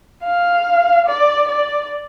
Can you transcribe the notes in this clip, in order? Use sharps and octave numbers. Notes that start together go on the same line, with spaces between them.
F5
D5
D5